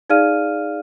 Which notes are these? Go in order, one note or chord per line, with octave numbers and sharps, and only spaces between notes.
D#4 G#4 D5 F5 F6 D#7